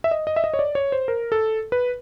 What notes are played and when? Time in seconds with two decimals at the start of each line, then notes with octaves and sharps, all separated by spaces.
0.04 E5
0.11 D#5
0.27 D#5
0.36 E5
0.44 D#5
0.54 C#5
0.59 D5
0.75 C#5
0.92 C5
1.08 A#4
1.32 A4
1.72 B4